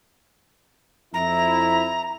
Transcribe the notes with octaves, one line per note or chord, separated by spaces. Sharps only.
F2 E4 A#5